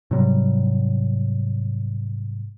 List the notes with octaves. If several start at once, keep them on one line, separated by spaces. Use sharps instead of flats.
G#2 C3 F#3 G3